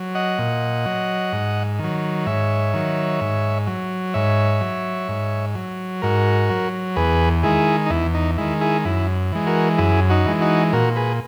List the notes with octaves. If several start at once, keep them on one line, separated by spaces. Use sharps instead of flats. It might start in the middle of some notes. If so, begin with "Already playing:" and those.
Already playing: F#3
D#5 F#5
A#2
F#3
G#2
D#3 F#3
G#2 C#5 E5
D#3 F#3
G#2
F#3
G#2 C#5 E5
F#3
G#2
F#3
G#2 F#4 A#4
F#3
E2 G#4 B4
D#3 G#3 E4 G#4
D#4
E2 E4
D#4
D#3 G#3 E4
E4 G#4
F#2 E4
E3 G#3
F#4 A#4
F#2 E4 G#4
D#4 F#4
E3 G#3
D#4 F#4
A#2 F#4 A#4
G#4 B4